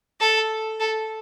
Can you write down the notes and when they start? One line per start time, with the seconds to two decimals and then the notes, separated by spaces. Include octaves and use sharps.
0.20 A4
0.80 A4